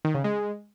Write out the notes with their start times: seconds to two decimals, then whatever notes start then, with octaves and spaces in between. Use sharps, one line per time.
0.05 D#3
0.14 C#3
0.24 G#3